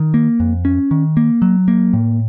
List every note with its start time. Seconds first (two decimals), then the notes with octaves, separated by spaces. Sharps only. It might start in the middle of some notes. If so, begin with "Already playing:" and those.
Already playing: D#3
0.14 A#3
0.40 F2
0.65 C#4
0.91 D#3
1.17 A#3
1.42 F#3
1.68 A#3
1.93 A2